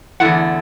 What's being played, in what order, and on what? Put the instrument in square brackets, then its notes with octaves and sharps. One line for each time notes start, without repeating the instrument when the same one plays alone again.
[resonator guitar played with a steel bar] E2 D3 A3 E4 F#5